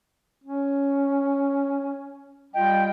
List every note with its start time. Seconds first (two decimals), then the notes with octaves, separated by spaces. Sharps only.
0.44 C#4
2.54 G3 F4 D#5 G5